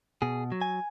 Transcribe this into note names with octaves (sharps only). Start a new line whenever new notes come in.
B2 G#4
F#3
G#5